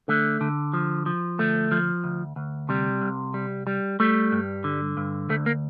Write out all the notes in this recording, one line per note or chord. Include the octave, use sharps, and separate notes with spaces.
D3 A3
D3
F3
F3
D2 A3
F3
D2
D2
C3 G3
C2
G3
G3
G3 A3
G2
D3
G2
D2 A3
A#3